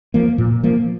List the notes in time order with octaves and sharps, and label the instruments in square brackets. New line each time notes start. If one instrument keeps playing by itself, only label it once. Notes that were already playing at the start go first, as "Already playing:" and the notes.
[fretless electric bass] F3 A#3
A#2
F3 A#3